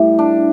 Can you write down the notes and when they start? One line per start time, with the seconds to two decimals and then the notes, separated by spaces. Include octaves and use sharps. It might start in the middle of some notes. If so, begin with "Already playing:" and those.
Already playing: A2 G3
0.19 D4